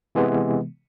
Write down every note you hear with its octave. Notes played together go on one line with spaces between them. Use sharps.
C3 E3 G#3 B3